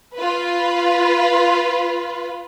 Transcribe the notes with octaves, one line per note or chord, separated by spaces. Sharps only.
F4 B4